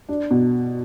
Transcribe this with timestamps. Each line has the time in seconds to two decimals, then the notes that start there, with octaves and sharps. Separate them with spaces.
0.09 D4
0.31 B2